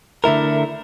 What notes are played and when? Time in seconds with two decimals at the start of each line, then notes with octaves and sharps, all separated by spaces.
0.24 D3 A3 E4 A#4